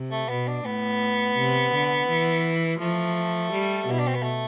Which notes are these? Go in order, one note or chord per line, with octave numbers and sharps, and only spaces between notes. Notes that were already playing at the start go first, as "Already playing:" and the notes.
Already playing: C3
A3
B2 B3
D4
A2 B3
C3
D3
E3
F3 A3
G3
B2 E4
D4
C4
B3
A3